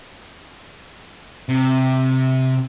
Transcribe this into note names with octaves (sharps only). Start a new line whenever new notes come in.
C3